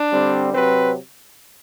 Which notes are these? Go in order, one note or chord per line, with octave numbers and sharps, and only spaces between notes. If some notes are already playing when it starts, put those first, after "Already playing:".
Already playing: D4
D3 G3 C4
C3 F#3 C4 B4